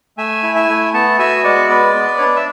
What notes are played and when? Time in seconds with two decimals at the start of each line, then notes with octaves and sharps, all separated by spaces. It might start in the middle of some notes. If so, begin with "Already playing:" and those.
0.17 A3 E5 G#5
0.43 E4
0.55 E5 G#5
0.69 A3
0.94 B3 F#5 A5
1.19 F#4 E5 G#5
1.44 G#3 D5 F#5
1.69 B3 B4 D5
1.95 B3
2.18 D4 C#5
2.26 D5
2.36 E5